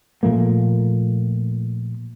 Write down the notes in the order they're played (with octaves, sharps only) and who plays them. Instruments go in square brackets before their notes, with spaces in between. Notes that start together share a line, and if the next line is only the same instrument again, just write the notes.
[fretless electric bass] A#2 F3 A3 A#3